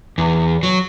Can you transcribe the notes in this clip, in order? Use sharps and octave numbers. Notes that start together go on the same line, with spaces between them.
E2
F#3